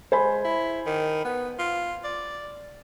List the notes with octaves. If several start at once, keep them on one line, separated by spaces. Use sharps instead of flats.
G#3 C5 G#5 B5
E4
D#3
B3
F4
D5